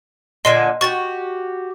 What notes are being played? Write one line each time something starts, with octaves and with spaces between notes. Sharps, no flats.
A#2 D3 D#5 G#5 C6 C7
F#4 G4 C#6 A6